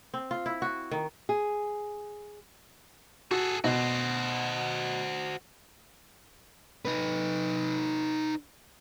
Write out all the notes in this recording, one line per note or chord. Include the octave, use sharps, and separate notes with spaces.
C4
F4
E4
F#4
D#3
G#4
F#4 G#4 A4
B2 F#4 C5
D#4 B4